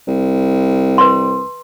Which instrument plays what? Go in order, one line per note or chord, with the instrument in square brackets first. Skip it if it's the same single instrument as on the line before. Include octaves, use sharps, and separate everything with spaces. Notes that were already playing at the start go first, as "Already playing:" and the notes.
[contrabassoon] C2
[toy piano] B4 C6